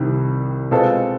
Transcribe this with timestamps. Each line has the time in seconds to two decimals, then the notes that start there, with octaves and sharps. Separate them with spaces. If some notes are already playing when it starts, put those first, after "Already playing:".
Already playing: C2 C3 D#3 G3
0.71 B2 G#3 C4 F4 A4